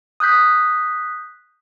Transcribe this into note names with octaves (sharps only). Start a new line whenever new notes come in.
D#6 F#6 G6 B6